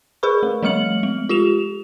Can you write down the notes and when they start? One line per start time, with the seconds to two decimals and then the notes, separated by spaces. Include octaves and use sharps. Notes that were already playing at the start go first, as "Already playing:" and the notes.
0.23 G#4 A#4 B4 B5 C#6
0.43 A3
0.63 F3 G3 A3 F6 C#7 F#7
1.03 G#3
1.29 F4 G4 E7 F7